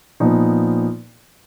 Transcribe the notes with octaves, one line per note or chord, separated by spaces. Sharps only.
A#2 F3 B3 D#4